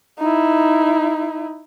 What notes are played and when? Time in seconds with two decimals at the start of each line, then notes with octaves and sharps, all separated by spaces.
0.19 D#4 E4